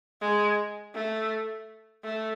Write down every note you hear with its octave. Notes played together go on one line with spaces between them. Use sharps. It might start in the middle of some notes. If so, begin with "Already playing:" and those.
G#3
A3
A3